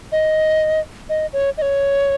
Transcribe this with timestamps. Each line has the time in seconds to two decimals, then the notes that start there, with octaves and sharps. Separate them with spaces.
0.12 D#5
1.09 D#5
1.33 C#5
1.58 D#5
1.62 C#5